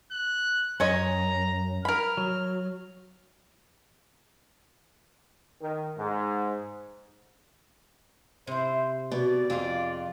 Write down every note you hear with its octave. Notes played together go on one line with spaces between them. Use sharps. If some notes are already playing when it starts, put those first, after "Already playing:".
F#6
F#2 C#4 C#5 D#5 A#5
A#4 B5 F6
F#3
D#3
G#2
C3 E4 C5
B2 D5
F2 C4 F4 G#4